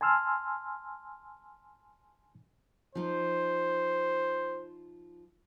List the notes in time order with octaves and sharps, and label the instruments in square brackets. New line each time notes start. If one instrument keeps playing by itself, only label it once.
[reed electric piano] G#5 A5 C6 E6 F6
[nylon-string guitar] F3 D#4 [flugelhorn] C5